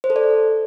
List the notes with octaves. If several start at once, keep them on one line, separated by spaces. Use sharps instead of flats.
C5
A4
D5